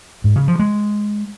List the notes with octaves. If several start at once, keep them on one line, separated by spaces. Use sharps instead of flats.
G#2
C#3
F3
G#3